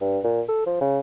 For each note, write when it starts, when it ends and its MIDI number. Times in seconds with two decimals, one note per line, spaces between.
0.01 0.19 43
0.24 0.41 46
0.49 0.62 69
0.66 0.79 53
0.81 1.00 49